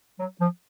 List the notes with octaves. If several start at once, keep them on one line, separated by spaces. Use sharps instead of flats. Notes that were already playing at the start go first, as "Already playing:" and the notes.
F#3
F3